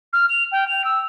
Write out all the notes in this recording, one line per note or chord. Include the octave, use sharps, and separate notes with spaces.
F6
F7
G5
F7
E6